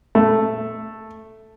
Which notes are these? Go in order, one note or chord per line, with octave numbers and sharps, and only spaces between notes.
A3